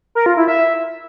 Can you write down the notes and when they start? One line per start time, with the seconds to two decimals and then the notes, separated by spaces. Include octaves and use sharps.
0.15 A#4
0.26 F4
0.37 E4
0.48 E5